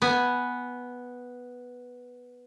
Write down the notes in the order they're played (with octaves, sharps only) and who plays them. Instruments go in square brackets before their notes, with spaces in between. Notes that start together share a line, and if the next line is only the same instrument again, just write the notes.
[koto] B3 G#5